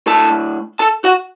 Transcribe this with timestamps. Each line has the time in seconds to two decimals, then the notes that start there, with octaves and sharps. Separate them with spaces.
0.06 A2 A3 D4 A4 A5
0.79 A4 A5
1.04 F#4 F#5